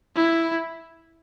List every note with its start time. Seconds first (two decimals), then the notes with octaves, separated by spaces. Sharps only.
0.16 E4